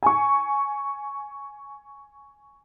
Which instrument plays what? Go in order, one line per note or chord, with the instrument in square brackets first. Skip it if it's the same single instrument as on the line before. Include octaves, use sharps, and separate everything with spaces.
[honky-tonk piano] G#5 C#6